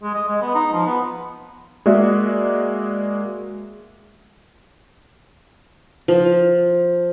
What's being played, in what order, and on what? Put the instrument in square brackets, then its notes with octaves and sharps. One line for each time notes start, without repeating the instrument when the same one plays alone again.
[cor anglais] G#3
D#5
G#3
B3
D#4
F3
B3
[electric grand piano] G#3 A#3 F#4 D5 E5
[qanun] F3